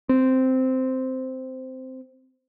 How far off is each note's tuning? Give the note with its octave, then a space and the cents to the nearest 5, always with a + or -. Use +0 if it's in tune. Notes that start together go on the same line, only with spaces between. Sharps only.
C4 -10